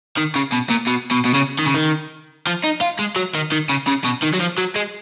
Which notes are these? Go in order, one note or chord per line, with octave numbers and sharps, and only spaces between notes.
D#3
C#3
B2
A#2
B2
B2
B2
C#3
D#3
C#3
D#3
F3
D#4
F4
G#3
F#3
D#3
D#3
C#3
C#3
B2
D#3
F#3
F3
F#3
G#3